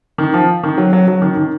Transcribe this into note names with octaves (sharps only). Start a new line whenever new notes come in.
D#3
F3
D#3
F#3
F#3
F#3
D#3
D#3